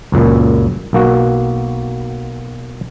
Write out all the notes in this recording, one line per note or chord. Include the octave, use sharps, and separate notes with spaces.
C#2 F#2 A#2
B1 A#3 F#4